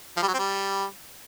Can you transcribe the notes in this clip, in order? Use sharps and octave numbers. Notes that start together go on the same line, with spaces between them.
F3
G3
F#3
C4
G3